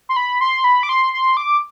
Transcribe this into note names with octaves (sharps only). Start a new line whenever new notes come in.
C6
B5
C6
B5
D6
C6
C6
D6